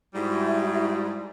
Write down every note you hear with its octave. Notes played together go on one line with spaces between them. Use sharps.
G#2 G3 E4 F#4 E5